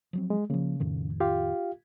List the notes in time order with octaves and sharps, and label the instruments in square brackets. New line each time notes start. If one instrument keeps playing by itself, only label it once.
[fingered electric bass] F3 F#3 C4
[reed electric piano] G#3
[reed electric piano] C#3 [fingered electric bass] F3 A#3
[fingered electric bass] F2 A2 D#3
[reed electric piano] F4 G4 F5